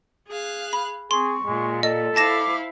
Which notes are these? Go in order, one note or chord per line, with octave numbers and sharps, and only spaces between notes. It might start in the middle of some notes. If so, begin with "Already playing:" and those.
G#4 F5 F#6
B5
C4 G#4 C6 C#6
A#2 G#3
A4 D5 D#5
E4 C5 F5 A5 D6 A#6 E7